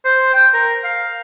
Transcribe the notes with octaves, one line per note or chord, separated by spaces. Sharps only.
C5
G5
A#4
F5